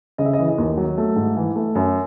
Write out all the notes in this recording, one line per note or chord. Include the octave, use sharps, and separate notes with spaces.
C#3 D#5
E5
D#5
E3
D#5
D#2
F#3
A3
G#2
E3
A3
F#2